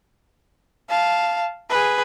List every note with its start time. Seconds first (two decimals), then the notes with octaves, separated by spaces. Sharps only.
0.89 F5 A5
1.70 G#4 B4